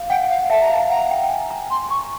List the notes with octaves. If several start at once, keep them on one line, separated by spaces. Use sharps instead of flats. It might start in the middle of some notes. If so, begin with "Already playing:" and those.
Already playing: F5
F#5 G5
F5
E5 A5
A#5
F5
A5
F#5 A#5
G5
G5
G#5
A#5
C6
C#6